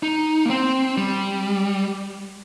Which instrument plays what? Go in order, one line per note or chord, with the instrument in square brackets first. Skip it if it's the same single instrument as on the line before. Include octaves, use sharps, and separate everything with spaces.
[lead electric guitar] D#4
A#3
C4
G3